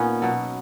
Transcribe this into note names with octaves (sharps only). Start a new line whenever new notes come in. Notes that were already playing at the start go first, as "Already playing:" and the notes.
Already playing: A#2 B3 C#4 D#4
B2 F#3